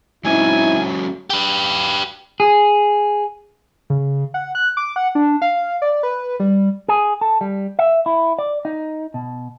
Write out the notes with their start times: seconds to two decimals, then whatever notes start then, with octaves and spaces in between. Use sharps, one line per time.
0.25 F#3 G#3 C4 C#4 D#4 E4 G#5
1.30 G4 B4
2.40 G#4
3.90 C#3
4.34 F#5
4.55 F#6
4.77 D6
4.96 F#5
5.15 D4
5.42 F5
5.82 D5
6.03 B4
6.40 G3
6.88 G#4
7.21 A4
7.41 G3
7.79 E5
8.06 E4
8.39 D5
8.65 D#4
9.14 B2